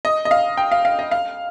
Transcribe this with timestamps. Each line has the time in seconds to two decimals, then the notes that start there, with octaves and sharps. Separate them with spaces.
0.05 D#5
0.25 D#5
0.31 F5
0.57 G5
0.72 F5
0.85 F5
0.99 D#5
1.11 F5